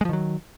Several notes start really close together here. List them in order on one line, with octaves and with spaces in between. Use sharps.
G#3 F3 D#3 F#3